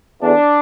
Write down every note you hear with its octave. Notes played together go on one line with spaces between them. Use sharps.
E2 D3 D4